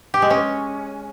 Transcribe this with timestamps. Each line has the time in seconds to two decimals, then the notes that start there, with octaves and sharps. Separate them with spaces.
0.14 G4
0.22 G#3
0.30 C#4